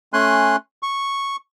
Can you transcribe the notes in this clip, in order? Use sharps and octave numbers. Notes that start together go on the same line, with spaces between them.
A3 C#4 G#5 C6 F#6
C#6